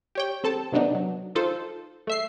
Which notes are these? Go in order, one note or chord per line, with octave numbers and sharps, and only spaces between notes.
G4 C#5 G5
C4 A4 A5
C3 D#3 F#3 B3 D4 D#4
F#3
D#4 F4 A4 C5
A3 E5 C7